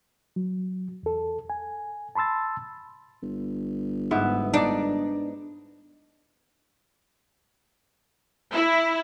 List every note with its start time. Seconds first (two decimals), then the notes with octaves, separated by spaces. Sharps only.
0.36 F#3
1.03 E2 A4
1.50 G#5
2.15 A5 B5 C6 E6 A6
3.23 G1
4.11 G#2 B3 E5
4.54 D4 D#4 D5
8.51 E4